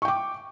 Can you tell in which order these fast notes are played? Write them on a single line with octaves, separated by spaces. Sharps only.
C#6 G5 D6